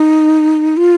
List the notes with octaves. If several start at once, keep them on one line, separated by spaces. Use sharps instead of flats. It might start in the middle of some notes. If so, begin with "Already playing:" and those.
Already playing: D#4
F4